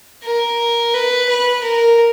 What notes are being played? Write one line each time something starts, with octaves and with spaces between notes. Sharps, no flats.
A#4
B4
B4
A#4